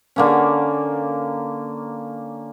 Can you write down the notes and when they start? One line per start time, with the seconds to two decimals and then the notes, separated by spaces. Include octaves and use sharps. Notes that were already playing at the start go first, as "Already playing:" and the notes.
0.16 D3 A#3 C#4